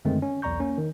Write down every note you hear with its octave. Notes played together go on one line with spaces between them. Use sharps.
F#2 D3 D#3 G#3 A3 C4
C#4
B1 E2 D5 A#5 C#6 G6
A#3 C#4
D#3